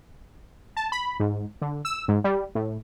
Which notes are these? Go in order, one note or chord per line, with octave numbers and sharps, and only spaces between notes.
A5
B5
G#2
D3
E6
G#2
G3
A2